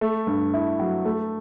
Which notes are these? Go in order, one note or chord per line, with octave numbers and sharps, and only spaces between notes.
A3
G2
E4
F#3
A3